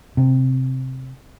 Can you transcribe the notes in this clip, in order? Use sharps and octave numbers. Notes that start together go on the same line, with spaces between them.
C3